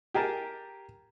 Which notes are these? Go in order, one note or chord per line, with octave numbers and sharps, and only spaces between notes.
G4 G#4 A#4 A5